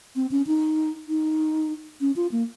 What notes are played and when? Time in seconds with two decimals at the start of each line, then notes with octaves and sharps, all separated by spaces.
0.16 C4
0.31 C#4
0.47 D#4
1.08 D#4
2.01 C#4
2.16 F4
2.32 A#3